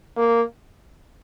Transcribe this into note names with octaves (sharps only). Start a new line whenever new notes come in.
A#3